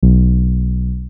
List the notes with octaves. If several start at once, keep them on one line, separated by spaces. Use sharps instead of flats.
B1